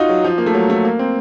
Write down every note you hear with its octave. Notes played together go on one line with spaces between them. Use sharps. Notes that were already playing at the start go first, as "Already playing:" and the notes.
Already playing: D#4 F4 F#4
F#3
F3
A#3
A3
F#3
A3
A#3
C4